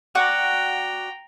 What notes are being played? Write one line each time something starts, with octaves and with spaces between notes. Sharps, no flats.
F#4 D5 F#5 G5 A#5